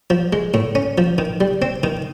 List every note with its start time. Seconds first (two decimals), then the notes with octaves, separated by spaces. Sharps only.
0.10 F3
0.33 G#3
0.54 A2
0.75 C#4
0.98 F3
1.18 D#3
1.41 G3
1.62 C4
1.83 D#3